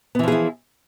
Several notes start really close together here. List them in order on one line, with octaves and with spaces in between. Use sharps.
B3 E3 F3 G#4 E4